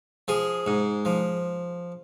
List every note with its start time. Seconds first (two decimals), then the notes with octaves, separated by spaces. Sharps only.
0.28 F3 G#4
0.67 G#2
1.05 F3